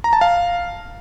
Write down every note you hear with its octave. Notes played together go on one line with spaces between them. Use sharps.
A#5
A5
F5